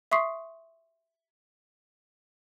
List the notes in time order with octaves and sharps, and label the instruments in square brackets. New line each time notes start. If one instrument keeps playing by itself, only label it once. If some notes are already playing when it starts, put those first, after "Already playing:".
[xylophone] E5 C6 C#6 D#6 B6 C7